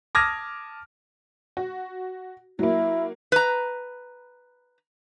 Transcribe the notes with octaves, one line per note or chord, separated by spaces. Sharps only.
A5 D6 D#6 F6 G#6 A#6
F#4
F#3 A#3 E4
B4 A#5